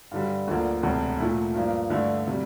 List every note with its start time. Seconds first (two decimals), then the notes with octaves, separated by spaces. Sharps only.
0.11 G2 D3 G3
0.47 D2 D3 F3 A#3
0.83 E1 D2 C3
1.19 A#2 A3 E4
1.54 G2 F3 A#3
1.90 G2 D3 A3 E4
2.28 C3 G3